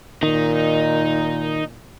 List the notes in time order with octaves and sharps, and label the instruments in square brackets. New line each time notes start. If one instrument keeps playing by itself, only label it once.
[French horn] A#2 [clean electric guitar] D#3 [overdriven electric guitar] D#4